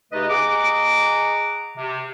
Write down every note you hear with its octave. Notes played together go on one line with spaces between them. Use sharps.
C#3 A3 D#4 G4 B4 D#5
G#4 D#5 F#5 A#5 D6
C3